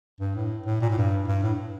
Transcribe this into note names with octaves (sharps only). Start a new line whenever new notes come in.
G2
A2
A2
A#2
A2
G2
G2
A2